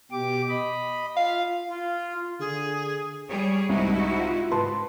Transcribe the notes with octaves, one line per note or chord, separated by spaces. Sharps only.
B2 G4 D6
D#5 B5
F4 F5
F4
D3 G#4
G3 G#4 C#5
C2 G#2 D#4 E4 F#4
F4
G#2 B4 A5 C6